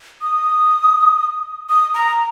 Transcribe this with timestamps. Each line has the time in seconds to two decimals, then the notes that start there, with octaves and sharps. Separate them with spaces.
0.22 D#6
1.69 D#6
1.94 A#5